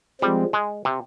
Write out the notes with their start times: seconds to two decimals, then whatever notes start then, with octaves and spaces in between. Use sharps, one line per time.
0.21 F3 G3 G#3 C4
0.53 G#3
0.85 C3